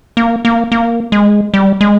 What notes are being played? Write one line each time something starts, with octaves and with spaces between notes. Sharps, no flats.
A#3
A#3
A#3
G#3
G3
G#3